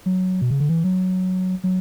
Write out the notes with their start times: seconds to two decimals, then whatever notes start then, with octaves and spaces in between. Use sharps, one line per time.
0.06 F#3
0.41 B2
0.51 C#3
0.60 D3
0.69 E3
0.84 F#3
1.64 F#3